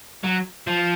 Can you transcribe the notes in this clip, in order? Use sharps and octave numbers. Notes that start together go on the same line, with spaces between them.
F#3
F3